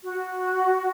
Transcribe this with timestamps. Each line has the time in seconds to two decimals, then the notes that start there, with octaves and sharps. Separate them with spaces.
0.04 F#4